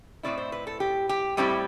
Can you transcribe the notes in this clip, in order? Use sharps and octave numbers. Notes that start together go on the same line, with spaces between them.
A2 F#3 C4 E4 D5
C5
B4
A4
G4
G4
A2 G3 C4 E4 G4